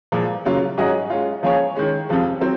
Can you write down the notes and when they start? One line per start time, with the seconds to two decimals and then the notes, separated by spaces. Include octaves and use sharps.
0.12 A#2 F3 G#3
0.45 C#3 F#3 A#3 F4
0.77 G#2 F#3 C#4 G#4 D#5
1.10 G#3 C#4 F4
1.43 F3 A#3 C#4 G#4 C#5
1.75 D#3 G#3 C#4
2.09 F2 C3 F3 G#3
2.40 F#3 C4